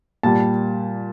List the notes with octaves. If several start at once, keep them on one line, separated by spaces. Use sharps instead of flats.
A#2 G3 A5